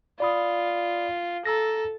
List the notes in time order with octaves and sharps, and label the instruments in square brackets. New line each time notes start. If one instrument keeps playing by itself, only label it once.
[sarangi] F4 [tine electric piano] D5 B5 D#6
[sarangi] A4 [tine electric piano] A#5 E6 A#6